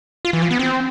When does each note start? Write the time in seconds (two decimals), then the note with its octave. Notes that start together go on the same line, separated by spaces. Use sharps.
0.25 F4
0.33 E3
0.42 F3
0.51 B3
0.59 C4